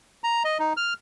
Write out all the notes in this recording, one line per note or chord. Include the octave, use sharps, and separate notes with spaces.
A#5
D#5
D#4
F6